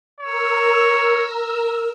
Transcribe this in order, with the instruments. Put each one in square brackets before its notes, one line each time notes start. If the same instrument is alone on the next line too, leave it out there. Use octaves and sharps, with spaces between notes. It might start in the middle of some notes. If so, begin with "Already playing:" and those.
[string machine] A#4 E6 [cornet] C#5